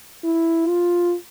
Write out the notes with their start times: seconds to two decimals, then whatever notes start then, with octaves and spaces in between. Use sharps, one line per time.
0.24 E4
0.68 F4